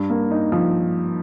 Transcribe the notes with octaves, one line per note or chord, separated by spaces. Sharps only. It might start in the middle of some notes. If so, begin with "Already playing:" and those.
Already playing: G2
A#3
D#4
F3